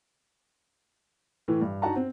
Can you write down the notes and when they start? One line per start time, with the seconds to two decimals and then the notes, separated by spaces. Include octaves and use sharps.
1.48 A2 E3
1.61 G2
1.82 D4 D#4 F#4 F#5 A5 A#5
1.96 C4